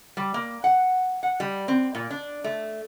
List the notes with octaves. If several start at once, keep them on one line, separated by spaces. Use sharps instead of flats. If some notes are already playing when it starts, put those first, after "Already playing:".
G3
A#3
F#5
F#5
G3
C4
A#2
D4
A3